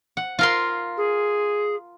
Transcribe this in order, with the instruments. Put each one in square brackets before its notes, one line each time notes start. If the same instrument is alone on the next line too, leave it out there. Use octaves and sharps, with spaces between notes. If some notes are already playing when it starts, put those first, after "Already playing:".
[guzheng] F#5
F4 A#4 C6
[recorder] G#4